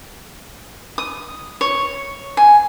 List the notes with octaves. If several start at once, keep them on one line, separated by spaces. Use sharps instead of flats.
D#6
C#5
G#5